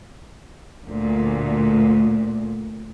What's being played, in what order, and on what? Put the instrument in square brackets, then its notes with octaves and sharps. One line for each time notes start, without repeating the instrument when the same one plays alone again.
[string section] D2 A#2